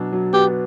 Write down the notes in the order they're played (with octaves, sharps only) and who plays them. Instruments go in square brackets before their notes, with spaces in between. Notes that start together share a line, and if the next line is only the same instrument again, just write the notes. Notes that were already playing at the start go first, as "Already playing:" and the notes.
Already playing: [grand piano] B2 F#3 D4
F#3
[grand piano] B3 [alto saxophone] G4